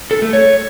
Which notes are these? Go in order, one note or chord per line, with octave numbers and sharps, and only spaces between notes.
A4
A3
C#5